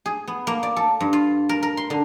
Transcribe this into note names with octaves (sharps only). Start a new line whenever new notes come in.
G#4
B3
A#3
D5
A4
G2
F4
A#4
A#4
C6
D3